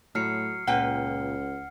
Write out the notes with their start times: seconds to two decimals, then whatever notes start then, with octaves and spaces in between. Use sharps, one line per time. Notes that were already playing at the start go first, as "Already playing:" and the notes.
0.15 A2 F#3 F6 C7 C#7
0.67 C#2 A#2 B4 F#5 G5